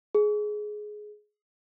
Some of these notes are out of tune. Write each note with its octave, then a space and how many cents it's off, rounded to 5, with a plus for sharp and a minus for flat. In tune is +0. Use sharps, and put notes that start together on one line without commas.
G#4 +15